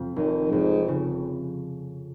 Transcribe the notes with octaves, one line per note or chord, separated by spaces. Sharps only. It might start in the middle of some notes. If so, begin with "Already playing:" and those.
Already playing: F2 C3 F3
F1 D#3
F1 G#2
C#3